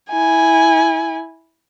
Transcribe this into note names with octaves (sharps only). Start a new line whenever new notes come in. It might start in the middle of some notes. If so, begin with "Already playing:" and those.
E4 G#5